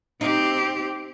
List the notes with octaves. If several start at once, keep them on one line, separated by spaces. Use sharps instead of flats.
C4 D#4 G4